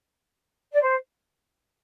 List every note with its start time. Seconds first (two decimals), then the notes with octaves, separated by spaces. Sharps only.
0.72 D5
0.81 C5